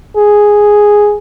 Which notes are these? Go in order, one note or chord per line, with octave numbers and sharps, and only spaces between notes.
G#4